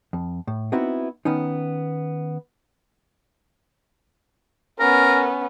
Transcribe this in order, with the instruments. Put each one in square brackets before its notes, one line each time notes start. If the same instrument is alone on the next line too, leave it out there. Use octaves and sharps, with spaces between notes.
[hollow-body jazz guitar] F2
A2
B3 C4 D#4 E4 F#4
D#3 B3 C#4 D#4
[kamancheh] B3 C#4 [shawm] A#4